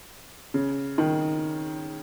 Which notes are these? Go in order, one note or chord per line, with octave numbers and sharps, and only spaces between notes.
C#3
D#3